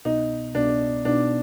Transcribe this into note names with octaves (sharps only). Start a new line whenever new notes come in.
C2 B2 B3 D#4
C2 B2 B3 D4
B2 B3 D4 D#4